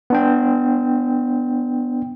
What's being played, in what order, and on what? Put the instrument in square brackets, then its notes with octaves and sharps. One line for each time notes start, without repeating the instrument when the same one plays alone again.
[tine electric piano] B3 D4 G5